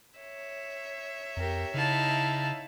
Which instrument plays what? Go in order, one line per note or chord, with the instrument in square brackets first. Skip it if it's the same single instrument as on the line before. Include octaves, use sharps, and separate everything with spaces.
[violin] C#5 E5
[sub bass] F2 [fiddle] G4 A#4
[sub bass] C#3 [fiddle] D#4 E4 [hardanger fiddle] F5 A5